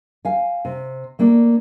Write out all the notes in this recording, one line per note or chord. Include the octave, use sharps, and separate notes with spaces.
F5 G#5
C3
A3 A#3 D4